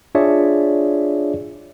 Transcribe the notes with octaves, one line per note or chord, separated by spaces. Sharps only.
D4 F4 G#4 C#5 D5 E5